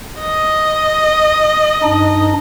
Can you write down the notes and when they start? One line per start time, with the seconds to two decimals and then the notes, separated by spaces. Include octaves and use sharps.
0.20 D#5
1.83 G2 D4 D#4